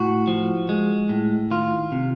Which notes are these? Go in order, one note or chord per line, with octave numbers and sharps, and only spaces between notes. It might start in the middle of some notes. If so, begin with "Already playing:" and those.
Already playing: A2 F#4
F3
G#3
A2
D#3 F4
C3